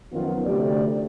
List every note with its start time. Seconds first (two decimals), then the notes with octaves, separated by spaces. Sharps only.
0.12 F#2 D#3 F3 F#3 B3 F4
0.45 D2 C3 A3 G4 D5